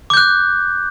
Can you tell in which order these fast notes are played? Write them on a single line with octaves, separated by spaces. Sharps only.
D6 G6 F#6